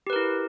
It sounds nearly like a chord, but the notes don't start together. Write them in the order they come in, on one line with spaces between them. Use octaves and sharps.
G4 B4 A#4 E4